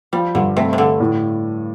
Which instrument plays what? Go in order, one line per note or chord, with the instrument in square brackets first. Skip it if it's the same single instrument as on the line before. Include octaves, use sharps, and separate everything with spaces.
[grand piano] F3 [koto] G3
[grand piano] G2 [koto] D3
[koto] C3 [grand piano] A3
[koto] C3
[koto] D3 [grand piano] A4
[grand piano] A2